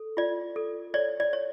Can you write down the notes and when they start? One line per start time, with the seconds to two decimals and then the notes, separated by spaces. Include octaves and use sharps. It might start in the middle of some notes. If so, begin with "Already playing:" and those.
Already playing: A4
0.17 F4 D5
0.56 A4
0.94 C#5 D5
1.20 D5
1.33 C#5